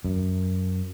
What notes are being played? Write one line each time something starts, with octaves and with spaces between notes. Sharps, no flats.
F#2